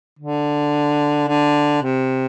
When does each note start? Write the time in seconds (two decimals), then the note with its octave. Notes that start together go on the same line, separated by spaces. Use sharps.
0.19 D3
1.28 D3
1.82 C3